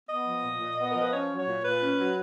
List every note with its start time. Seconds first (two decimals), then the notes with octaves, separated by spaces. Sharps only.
0.10 B3 D#5
0.27 F3
0.44 A#2
0.61 A#2
0.79 B3
0.90 A#4
0.95 F3
1.02 B4
1.13 C#4 C#5
1.30 F#3
1.38 C#5
1.47 A#2
1.64 A#2 B4
1.81 C#4
1.99 F#3